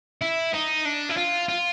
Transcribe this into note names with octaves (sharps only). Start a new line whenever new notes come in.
E4
D#4
D4
E4
F4
F4